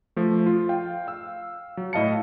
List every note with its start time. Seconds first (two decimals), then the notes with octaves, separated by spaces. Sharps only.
0.16 F3 A3
0.46 F4
0.69 F5 G5
1.07 F5 E6
1.77 F#3
1.93 A2 E4 D#5 F5 A5 C#7